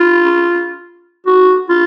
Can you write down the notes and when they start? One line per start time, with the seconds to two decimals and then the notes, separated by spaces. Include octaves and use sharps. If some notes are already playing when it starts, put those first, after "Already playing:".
Already playing: F4
1.26 F#4
1.69 F4